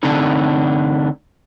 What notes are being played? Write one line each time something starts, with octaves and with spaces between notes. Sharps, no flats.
D3 A3 C4 D4 D#4 A4